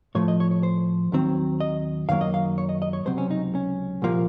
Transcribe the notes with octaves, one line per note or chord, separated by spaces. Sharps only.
A2 F3 A3 C#5
D#5
C#5
C#5
C5
D#2 D#3 F#3 C4
D#5
F#2 D#3 F#3 A#3 F5
D#5
F5
C#5
D#5
D#5
C#5
C#2 C3 F#3 C4 C5
C#4
D#4
C#4
C2 A#2 F3 A#3